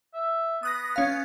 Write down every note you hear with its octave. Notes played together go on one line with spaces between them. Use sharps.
E5
B3 D#6 F#6 A#6
C#4 F5